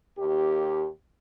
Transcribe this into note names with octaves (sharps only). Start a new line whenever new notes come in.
D#2 G4